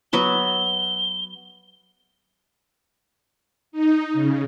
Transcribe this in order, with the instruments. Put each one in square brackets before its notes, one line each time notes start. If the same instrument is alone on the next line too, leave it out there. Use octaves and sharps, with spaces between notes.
[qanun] F#3 B3 F#4 [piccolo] G7
[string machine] D#4
C#3